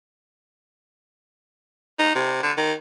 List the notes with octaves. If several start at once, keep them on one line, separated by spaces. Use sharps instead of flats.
D#4
C3
D3
D#3